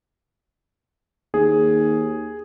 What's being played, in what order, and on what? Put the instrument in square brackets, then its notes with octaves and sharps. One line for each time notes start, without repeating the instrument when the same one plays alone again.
[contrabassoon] D#2 [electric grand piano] G#4